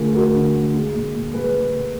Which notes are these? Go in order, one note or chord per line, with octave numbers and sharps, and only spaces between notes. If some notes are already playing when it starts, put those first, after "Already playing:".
Already playing: D2 D3 G#3 F4 G#4 A#4
D2 F#4 A#4
D3
G#3
G#3
A#2
A#2
G#3 G#4 B4
G#3
A#2